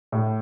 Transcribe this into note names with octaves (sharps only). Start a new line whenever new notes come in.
A2